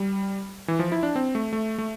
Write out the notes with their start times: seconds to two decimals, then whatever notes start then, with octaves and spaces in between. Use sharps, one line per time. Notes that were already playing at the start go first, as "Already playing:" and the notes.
Already playing: G3
0.68 E3
0.79 F3
0.92 E4
1.03 D4
1.16 C4
1.35 A3
1.53 A3
1.78 A3